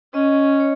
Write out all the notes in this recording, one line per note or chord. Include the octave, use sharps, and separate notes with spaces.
C#4 D#5
C#5